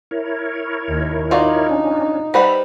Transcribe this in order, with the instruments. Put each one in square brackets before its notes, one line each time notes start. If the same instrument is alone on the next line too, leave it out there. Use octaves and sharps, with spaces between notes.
[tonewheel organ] E4 A#4 C#5
[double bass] D#2
[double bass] D#4 [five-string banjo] F4 F#4 D5
[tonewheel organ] C#4 D4
[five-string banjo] G3 B4 F#5 [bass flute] C5 [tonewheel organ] E5 A#5 B5